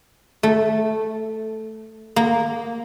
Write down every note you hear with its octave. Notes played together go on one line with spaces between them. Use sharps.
A3
A#3